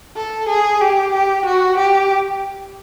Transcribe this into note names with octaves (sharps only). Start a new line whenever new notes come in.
A4
G#4
G4
G4
F#4
G4